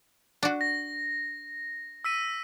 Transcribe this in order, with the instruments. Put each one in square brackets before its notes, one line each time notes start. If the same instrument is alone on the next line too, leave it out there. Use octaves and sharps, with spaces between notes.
[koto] D4 F#4
[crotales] A#6
E6 B6 D#7